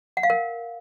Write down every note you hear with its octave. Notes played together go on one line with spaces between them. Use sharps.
F#5
F5
A#4